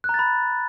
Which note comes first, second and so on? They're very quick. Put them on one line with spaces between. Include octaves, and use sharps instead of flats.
F#6 A#5 A6 B5